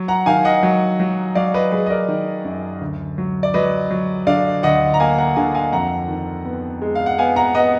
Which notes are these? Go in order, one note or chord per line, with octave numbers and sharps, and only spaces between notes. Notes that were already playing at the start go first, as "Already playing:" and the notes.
Already playing: F#3
F#5 A#5
D#3 F5 G#5
D#5 F#5
F#3
F#3
F#3 D5 F5
B4 D#5
F#3 G#4 B4
D#5
A#4 D5
D#3
F#2
D2
F#3
D5
F#3 B4 D#5
F#3
D3 D5 F5
D2 D#5 F#5
A#5
A#3 F5 G#5
F#5 A#5
D3 F5 G#5
F5 G#5
F2 F#5 A#5
D#3
B3
G#3
F5
F#5
B3 F5 G#5
F#5 A#5
B3 D#5 F#5